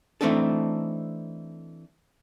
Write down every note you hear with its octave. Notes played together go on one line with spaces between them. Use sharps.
E3 A3 C4 D4 D#4 A4